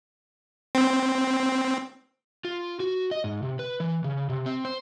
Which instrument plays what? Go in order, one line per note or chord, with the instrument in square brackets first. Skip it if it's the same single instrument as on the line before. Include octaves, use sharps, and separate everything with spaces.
[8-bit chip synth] C4
[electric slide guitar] F4
F#4
D#5
G#2
C3
B4
E3
C#3
C3
C4
C5